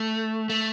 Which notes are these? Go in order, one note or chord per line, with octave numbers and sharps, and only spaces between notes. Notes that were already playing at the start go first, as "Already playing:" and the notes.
Already playing: A3
A3